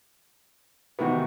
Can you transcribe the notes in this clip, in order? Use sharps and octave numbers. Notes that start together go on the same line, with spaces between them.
C3 D#3 E3 B3 F#4